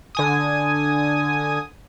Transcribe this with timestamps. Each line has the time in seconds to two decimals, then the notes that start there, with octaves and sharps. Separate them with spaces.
0.15 D3 G#5 D#6